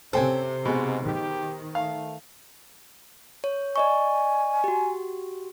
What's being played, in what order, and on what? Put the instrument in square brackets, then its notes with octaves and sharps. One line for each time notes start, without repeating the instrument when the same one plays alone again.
[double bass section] C3 [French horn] C#4 [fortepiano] A4 G5 G#5 [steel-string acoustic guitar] C5
[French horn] G#2 [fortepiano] B2 G#3
[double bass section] D#3 [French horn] G4
[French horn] A3 [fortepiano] F5
[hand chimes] C#5
[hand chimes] D5 D#5 C#6 [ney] G#5
[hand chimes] F#4 G4